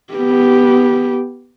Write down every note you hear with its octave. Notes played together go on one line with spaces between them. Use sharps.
B3 G4